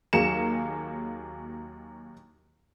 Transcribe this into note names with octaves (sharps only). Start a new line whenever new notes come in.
D#2 F#3 A#3 G#4 C#7 E7